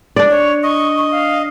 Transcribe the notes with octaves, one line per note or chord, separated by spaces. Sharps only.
D4 D5
C#5
D#5 C#6
C#6
F5